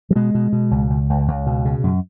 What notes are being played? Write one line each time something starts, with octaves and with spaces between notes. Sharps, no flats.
F#3
B2 G#3
B2
B2
C#2
C#2
C#2
C#2
B2
C#3
F#2